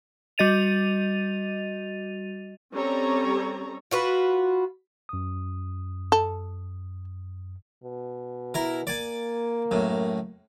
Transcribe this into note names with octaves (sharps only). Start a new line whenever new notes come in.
G3 F#4 D#5 A6 D#7 F7
G3 C4 C#4 A4 C#5 A#5
F4 F#4 B4
F#2 D#6
A4
B2
E4 A#4
A#3 D5 G#5
F#2 A2